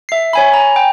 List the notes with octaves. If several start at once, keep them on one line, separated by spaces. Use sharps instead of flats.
E5 C7
C#5 G#5 B5
G#5 A#5
G5